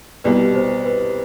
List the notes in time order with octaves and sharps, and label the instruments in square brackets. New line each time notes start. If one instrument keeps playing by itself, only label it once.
[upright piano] C2 B2 G3 [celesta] B4 D5
[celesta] C5
B4